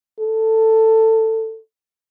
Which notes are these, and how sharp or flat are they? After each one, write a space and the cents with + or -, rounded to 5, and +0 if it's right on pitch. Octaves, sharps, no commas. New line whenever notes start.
A4 +15